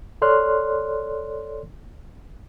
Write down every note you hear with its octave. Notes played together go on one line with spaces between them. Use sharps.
A4 C#5 D5 C6 F6 F#6